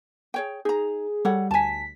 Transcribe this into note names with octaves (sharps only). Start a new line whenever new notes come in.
G#4 C#5 G5
D#4 G#4 A#5
G3 A4 C#5 F#5
D2 G#5 A5 B6